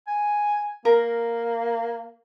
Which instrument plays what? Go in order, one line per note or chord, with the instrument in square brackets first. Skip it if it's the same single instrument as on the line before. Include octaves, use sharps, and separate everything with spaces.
[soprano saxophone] G#5
[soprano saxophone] A#3 [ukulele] A#4